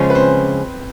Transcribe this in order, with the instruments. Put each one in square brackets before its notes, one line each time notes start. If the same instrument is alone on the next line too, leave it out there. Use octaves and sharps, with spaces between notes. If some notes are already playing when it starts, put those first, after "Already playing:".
Already playing: [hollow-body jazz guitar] C#3 F3 G#3 C#4
[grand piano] B4
C4 C5